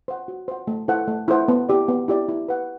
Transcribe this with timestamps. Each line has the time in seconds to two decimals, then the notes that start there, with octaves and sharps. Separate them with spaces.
0.08 C5 F#5
0.28 F#4
0.48 C5 F#5
0.67 A3
0.88 E4 A4 C5 F#5
1.08 A3
1.28 E4 A4 C5 F#5
1.48 B3
1.69 E4 G4 D5
1.88 B3
2.08 E4 G4 D5
2.29 E4
2.48 B4 F#5